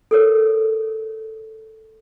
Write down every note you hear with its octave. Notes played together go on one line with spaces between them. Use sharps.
A4 A#4 C#5